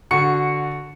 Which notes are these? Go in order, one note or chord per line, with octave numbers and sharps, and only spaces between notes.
D3 F#4 C#6 C#7